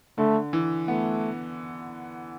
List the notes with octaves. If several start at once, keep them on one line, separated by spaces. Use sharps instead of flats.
D3 A3
E3
A3 B3